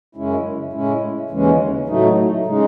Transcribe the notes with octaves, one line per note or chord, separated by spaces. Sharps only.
F#2 C#3 G#3 C#4 E4
A2 G#3 C#4 E4
D#2 C#3 E3 G#3 C#4
A2 F#3 A3 D#4
C#3 G#3 D#4